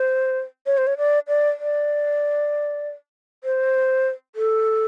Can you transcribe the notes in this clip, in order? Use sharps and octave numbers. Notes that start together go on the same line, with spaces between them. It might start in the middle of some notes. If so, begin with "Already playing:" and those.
Already playing: C5
C#5
C5
C#5
D5
D5
D5
C5
A4